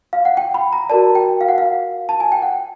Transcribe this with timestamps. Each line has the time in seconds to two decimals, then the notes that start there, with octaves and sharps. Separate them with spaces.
0.13 F5
0.25 F#5
0.37 G5
0.54 B5
0.73 A#5
0.89 F#4 A#4 D5 A5
1.15 G5
1.41 F5
1.48 F#5
1.58 F5
2.09 A5
2.20 G#5
2.32 G5
2.42 F#5